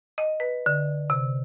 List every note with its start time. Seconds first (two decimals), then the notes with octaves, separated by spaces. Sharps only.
0.18 D#5
0.40 B4
0.66 D3
1.10 C3